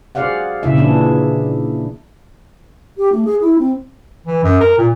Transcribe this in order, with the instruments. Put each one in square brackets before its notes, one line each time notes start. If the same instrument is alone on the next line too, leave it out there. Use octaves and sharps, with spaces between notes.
[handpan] F#4 G#4 C5 D5 F5 F#5
A#2 C#3 E4 E5
A#2 E3 D4 G#4
[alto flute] G4
A3
G#4
E4
C4
[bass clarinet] E3
F#2
A#4
A#2